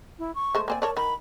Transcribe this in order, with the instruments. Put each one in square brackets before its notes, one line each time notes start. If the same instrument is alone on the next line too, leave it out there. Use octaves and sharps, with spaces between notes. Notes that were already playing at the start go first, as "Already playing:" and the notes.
[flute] E4
C#6
[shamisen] G#3 A3 C5
[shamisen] A#3 C4 D5 [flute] G#5
[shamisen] A#4 C#5 D5 [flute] A5
[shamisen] D#3 A#4 [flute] B5